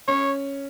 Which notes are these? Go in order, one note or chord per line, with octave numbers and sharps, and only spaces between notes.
C#4 C#5